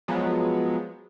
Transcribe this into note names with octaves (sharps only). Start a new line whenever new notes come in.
F3 F#3 G#3 B3